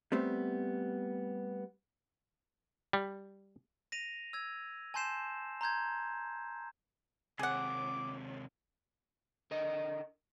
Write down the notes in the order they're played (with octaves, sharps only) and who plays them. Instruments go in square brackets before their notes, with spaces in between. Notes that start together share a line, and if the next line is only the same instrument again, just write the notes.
[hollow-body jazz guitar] G3 A3 B3 C4
[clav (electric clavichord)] G3
[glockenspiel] A#6 D#7 F7
E6 G#6
G#5 A5 C6 G6 C7 E7
A#5 C6 G6 G#6
[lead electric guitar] D#2 C3 [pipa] G#4 F#5 [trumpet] D6
[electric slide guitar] D3 A#4 D#5